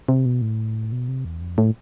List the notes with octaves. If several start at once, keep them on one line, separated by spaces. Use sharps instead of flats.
C3
B2
A2
B2
C3
E2
F2
A2